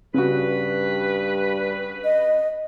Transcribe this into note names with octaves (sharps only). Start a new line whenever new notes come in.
G2 C#3 F#4 B4
D#5